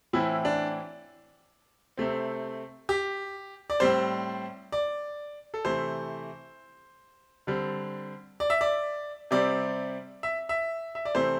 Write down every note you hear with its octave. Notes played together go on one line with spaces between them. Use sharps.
A2 E3 C4 E4
D4
C3 A3 C4
G4
D5
A2 G3 C4 C5
D5
A4
C3 E3 A3 C5
D3 G3 C4
D5
E5
D5
C3 G3 C4 D5
E5
E5
E5
D5
C3 E3 A3 C4 C5